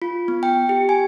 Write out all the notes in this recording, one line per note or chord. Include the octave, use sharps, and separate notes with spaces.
F4
B3
G5
G4
G#5